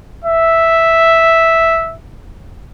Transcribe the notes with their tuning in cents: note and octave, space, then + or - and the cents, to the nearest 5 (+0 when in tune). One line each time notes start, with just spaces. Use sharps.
E5 -5